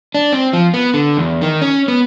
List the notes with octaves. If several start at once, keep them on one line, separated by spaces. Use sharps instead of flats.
D4
C4
F3
B3
D3
E2
D#3
C#4
B3